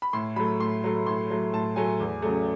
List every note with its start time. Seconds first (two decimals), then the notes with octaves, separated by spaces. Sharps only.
0.02 B5
0.13 A2 C6
0.36 F#3 A3 B5
0.60 A2 C6
0.84 F#3 A3
1.06 A2 C6
1.30 F#3 A3
1.53 A2 A5
1.76 F#3 A3 G#5
2.00 E2
2.22 C#3 F#3 A3